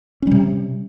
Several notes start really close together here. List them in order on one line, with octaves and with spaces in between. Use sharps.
C#4 G3 C3